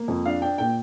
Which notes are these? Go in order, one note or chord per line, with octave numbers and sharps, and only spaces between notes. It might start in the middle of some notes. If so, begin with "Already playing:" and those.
Already playing: A#3
F2
D4 F5
D4 G5
A#2 G5